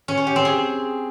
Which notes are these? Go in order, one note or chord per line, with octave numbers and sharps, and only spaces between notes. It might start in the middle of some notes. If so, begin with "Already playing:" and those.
C#4
C#5
G4
C4
G#4